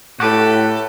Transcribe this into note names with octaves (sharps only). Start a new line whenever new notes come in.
A2 F#4 G4 A4 B4